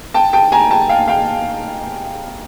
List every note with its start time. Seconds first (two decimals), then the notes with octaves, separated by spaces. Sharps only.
0.14 G5 A5
0.33 G5 A5
0.52 G#5 A#5
0.71 G5 A5
0.89 F5 G5
1.08 F5 G5